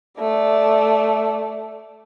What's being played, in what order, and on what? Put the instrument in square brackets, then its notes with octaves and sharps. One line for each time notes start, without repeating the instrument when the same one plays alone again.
[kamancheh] A3 D5